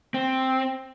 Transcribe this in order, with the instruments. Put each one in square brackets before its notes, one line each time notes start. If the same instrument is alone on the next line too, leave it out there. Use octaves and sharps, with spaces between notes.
[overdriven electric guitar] C4